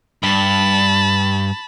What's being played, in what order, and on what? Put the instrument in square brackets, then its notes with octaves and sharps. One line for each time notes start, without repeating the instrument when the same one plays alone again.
[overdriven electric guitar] G2 [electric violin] A5 B5